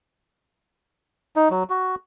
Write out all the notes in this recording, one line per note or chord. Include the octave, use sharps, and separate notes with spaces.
D#4
F#3
F#4